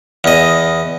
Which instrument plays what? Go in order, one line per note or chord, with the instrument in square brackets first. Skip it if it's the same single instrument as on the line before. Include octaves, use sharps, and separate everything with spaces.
[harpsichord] E2 D#5